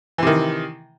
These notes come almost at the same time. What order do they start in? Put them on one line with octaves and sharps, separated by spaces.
E3 C3 D#3